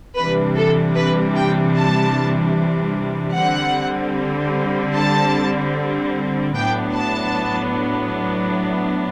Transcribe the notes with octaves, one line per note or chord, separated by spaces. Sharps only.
C3 E3 G3 D4 B4
A4
B4
G5
A5
D3 G3 C4 F#5
A5
A2 F#3 B3 D4 G5
A5